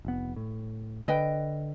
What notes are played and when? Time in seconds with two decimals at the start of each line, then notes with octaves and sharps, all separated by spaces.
0.05 F1 B3
0.36 A2
1.08 D3 B4 D#5 G5